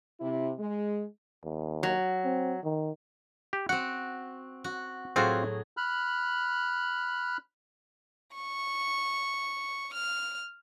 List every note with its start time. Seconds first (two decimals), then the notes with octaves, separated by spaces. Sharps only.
0.20 C3 E4
0.59 G#3
1.44 D#2
1.83 F#3
2.25 C4
2.64 D#3
3.53 G4
3.69 C4 F#4 F#5
4.64 F#4
5.16 A2 F#3 C4 F4 F#4 G#4
5.77 B5 F6 F#6
8.34 C#6
9.94 F6